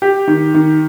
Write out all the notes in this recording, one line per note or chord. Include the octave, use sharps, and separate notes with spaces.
G4
D#3
D#3